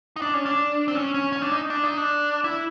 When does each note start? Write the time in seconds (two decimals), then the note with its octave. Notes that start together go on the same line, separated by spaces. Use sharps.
0.16 D#4
0.22 D4
0.34 C#4
0.46 D4
0.88 C4
0.95 C#4
1.14 C#4
1.32 C#4
1.42 D4
1.51 D#4
1.70 D4
1.84 D#4
1.97 D4
2.44 E4